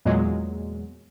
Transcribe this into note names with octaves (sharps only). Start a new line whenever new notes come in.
E2 A#2 F#3 G#3